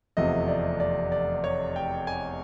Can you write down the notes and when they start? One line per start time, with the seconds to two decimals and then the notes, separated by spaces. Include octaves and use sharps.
0.17 F1 E2 C3 F3 A3 D#5
0.48 D5
0.80 D5
1.12 D5
1.44 C#5
1.76 G5
2.07 G#5